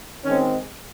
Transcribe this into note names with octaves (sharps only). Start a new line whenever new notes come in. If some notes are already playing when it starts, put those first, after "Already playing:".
D#3 G#3 C4 C#4